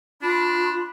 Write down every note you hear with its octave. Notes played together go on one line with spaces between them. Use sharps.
D4 F4 B5